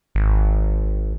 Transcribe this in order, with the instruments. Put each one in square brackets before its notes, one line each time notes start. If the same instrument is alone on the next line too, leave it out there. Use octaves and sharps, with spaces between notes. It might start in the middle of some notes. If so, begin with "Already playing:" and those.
[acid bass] G#1